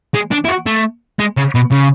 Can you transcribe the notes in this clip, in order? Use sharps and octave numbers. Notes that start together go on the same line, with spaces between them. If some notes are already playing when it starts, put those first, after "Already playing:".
G#3
D4
E4
F#4
A3
G#3
C#3
B2
C#3